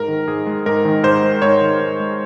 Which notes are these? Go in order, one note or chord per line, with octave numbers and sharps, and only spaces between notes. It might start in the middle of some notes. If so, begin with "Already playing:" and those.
Already playing: G#2 A#4
D#3
G#2 G#4
G#3
G#2 A#4
D#3
G#2 C5
G#3
G#2 C#5
D#3
G#2
G#3